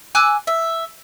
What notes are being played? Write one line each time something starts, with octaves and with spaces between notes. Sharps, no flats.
G#5 D6 E6 F#6
E5